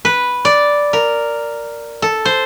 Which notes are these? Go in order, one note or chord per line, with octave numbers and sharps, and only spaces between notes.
B4
D5
A#4
A4
C5